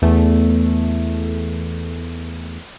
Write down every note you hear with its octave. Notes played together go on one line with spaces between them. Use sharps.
E2 A3